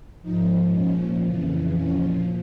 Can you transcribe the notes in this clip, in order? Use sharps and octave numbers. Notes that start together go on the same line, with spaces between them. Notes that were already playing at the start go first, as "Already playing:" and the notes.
G#2 F3 D#4
A#2 F3 C#4
F2 C#3 E3
A#2 F3 C#4